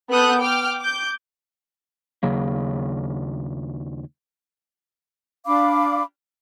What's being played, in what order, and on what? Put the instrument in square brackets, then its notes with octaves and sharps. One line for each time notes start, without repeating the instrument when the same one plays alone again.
[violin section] B3 A4 D#6 F#6 G6
G5 D6 F6
D6 G6
[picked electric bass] D#2 C#3 F#3 A#3
[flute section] D4 F5 B5 D6